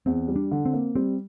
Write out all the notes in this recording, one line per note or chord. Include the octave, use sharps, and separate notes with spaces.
E2 C4
G3
D4
D3
C4
A#3
G3 C4